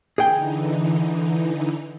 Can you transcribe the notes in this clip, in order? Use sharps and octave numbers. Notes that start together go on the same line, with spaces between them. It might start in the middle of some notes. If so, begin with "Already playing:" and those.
D3 E3 D#4 G#4 G5